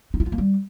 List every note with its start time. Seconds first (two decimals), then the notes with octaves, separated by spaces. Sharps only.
0.14 D#4
0.20 E4
0.26 F4
0.32 A#3
0.38 G3